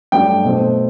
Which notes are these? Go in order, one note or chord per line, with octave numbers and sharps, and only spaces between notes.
G2 F#3 A3 D4 G5
B2 A3 C4